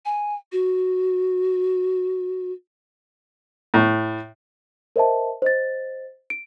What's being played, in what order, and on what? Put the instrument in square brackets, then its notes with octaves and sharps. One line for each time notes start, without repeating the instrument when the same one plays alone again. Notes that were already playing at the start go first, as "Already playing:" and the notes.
[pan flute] G#5
F#4
[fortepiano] A2
[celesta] A#4 C5 D#5 E5 A5
C5 D#5 A6
D7